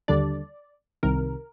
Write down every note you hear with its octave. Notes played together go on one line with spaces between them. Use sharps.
D#2 D3 G3 D4 D5
C2 C3 D#3 A#4